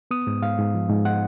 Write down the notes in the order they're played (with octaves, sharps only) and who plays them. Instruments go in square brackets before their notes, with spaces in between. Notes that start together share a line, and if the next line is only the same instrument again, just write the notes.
[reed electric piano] B3 D#6
G#2
G#2 F5
G#2
F3
G#2
D#4 F#5